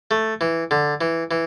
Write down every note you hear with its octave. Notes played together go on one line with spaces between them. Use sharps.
A3
E3
D3
E3
E3